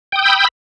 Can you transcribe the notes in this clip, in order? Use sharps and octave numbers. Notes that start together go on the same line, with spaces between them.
G5 B5 D#6 E6 G6